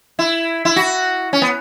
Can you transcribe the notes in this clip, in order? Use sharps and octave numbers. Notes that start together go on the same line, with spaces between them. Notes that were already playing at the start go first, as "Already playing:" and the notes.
E4
E4
F#4
C#4
B3